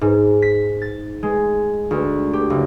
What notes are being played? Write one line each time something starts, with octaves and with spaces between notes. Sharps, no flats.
G#2
B6
A6
G#3
D2
G4
F#1